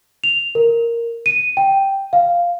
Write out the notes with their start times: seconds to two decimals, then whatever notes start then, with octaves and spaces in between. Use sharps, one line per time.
0.24 F7
0.55 A#4
1.26 D#7
1.57 G5
2.13 F5